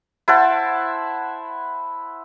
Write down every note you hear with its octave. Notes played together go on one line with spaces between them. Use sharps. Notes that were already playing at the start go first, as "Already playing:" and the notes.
E4 C5 F#5 A5